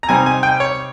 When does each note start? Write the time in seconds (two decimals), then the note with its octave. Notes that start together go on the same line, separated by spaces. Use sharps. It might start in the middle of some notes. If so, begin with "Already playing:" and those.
0.03 A#5
0.09 C3 G3 C4 D#4 G#5
0.26 G#5
0.43 G5
0.60 C#5